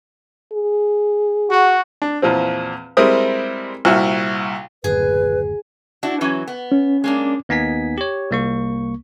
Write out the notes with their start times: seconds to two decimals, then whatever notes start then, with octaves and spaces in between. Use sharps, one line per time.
0.53 G#4
1.50 F#4
2.02 D4
2.22 E2 A#2 F3 C4
2.97 G3 G#3 C4 E4 A#4 D#6
3.85 C2 A#2 F#4 E5 F6
4.84 F#1 D2 A2 G#4 B4
6.03 D4 E4 F#4
6.21 E3 F#3 C#4
6.48 B3
6.72 C#4
7.04 G#3 A#3 D4
7.49 D#2 B3 D#4 G#5 B6
7.98 G4 C#5
8.31 C2 A#3 C#6